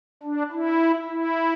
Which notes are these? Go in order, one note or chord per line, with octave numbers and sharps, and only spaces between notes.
D4
E4
E4